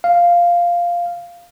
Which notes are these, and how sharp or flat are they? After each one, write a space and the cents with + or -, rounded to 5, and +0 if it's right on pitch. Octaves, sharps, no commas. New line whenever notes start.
F5 -5